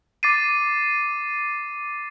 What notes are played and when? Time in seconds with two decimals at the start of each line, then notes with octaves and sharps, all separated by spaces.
0.23 D6 A6 C7 D#7